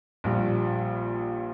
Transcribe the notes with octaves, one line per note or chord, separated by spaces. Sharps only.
A#1 A#2 G3